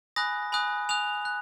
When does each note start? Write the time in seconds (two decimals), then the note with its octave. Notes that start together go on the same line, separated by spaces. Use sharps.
0.16 G#5 B5 D#6 F#6 A#6
0.52 G#5 B5 D#6 F#6
0.89 G#5 D#6 F#6 F7
1.25 F#6